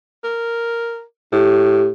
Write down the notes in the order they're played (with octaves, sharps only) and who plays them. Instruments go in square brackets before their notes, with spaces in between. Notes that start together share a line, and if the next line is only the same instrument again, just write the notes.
[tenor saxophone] A#4
[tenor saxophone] A2 [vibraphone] G4